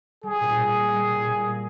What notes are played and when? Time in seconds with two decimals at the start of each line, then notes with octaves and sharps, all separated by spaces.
0.23 G3 G#4
0.40 A#2
0.58 A#2
0.76 A#3
0.94 G3
1.11 A#2
1.28 A#2
1.45 A#3